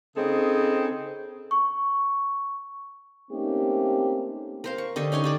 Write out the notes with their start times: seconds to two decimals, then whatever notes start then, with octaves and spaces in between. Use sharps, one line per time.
0.16 C#3 C4 D#4 G#4 A4
1.51 C#6
3.31 A3 A#3 C4 C#4 D#4 G4
4.64 A#4 C5 F5
4.78 C#6
4.96 D3 G4 D#5 C#6
5.12 C#4 D#4 C#5 G#5
5.24 D3 G4 D5